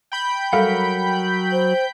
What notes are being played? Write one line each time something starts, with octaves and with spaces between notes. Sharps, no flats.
G5 B5 G6
F#3 G3 A4 A#4 F5 F#5
C5